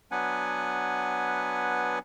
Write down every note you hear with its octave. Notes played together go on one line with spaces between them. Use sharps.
F#3 B3 D4 B4 F#5 G#5